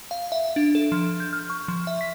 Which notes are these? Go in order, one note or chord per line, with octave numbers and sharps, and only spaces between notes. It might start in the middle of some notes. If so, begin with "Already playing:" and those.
F5
E5
D4
A4
F3
G6
F6
C#6
F3
E5
B6